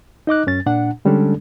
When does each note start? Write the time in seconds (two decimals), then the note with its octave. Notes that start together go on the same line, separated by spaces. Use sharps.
0.27 D#4 D#5 D6 F#6
0.47 F#2 C#4 A6
0.66 A#2 D4 F#5
1.05 D3 G3 G#3 C#4 D4 A4